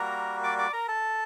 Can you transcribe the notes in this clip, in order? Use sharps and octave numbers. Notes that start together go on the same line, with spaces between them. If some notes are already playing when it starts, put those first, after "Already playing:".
Already playing: G3 A#3 F#4 A#4 A#5
D5 D6
D5 D6
A#4 A#5
A4 A5